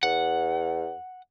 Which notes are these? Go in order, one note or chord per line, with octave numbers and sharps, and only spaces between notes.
E2 F#5